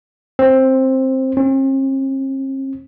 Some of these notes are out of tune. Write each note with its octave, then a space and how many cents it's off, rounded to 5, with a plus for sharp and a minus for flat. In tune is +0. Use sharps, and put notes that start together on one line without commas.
C4 +10
C4 +45